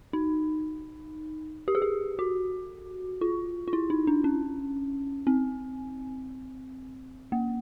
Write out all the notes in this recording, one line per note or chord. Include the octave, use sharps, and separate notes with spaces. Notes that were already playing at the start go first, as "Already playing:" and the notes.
D#4
G4
G#4
G4
F#4
F4
F4
E4
D#4
D4
C#4
C4
A#3